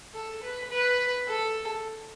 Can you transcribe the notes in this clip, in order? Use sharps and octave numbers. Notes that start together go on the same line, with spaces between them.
A4
B4
B4
A4